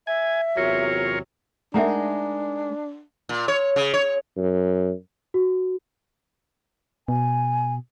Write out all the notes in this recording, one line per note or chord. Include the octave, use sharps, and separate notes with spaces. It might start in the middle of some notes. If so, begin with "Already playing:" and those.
E5 G#5
E2 C3 F#3 F4 A#4 C#5
G#3 D4 D#4 A#4 E5 F#5 A#5
A#2
C#5
C#3
C#5
F#2
F#4
B2 G#5